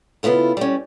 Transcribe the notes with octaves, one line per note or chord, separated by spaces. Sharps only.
C#3 B3 E4 F4 A4
G3 C#4